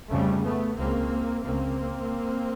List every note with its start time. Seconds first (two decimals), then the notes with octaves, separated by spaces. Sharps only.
0.10 F2 C#3 G3 A3
0.44 A3 B3
0.77 C#2 C#3 A#3 C4
1.44 C#2 C#3 A#3 C4